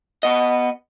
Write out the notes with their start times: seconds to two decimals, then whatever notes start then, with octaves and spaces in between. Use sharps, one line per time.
0.23 B3 D#5